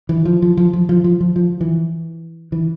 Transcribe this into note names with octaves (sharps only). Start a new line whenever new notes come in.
E3
F3
F3
F3
F3
F3
F3
F3
F3
E3
E3